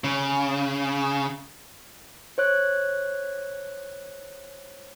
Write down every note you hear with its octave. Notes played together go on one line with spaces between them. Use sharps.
C#3
C5 C#5 F#6